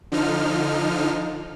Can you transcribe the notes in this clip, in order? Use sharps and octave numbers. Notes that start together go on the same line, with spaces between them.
D3 F3 D#4 F6